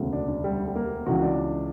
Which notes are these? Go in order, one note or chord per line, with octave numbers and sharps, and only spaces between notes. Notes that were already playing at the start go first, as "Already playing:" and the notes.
Already playing: E1 D2 C#3
D4
D4
G3
G3
A#3
C#2 C#3 E3 F#4
D4